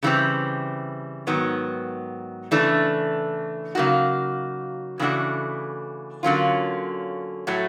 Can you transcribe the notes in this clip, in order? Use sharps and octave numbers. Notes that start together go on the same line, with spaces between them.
C#3 E3 G3 C4
G#2 D#3 F#3 B3
C#3 E3 A3 D4
C#3 F#3 A#3 D#4 F#4
C#3 E3 A3 D4 F#4
D3 F#3 A#3 C#4 F4
A2 F#3 A3